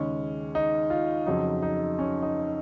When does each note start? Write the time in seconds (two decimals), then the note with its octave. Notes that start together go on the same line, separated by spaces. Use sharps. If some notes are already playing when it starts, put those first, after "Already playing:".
Already playing: D#2 C#3 G#3 C#4
0.55 D#4
0.90 F4
1.26 F2 C#3 F#3 D#4
1.62 D#4
1.99 C#4
2.22 D#4